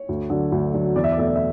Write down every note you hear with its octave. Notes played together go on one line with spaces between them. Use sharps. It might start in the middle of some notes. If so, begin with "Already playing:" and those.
Already playing: C#5
D2
D3 F#3
D2
D3 F#3
E2 D5
E5
D5
B2 A3 E5
D5
E5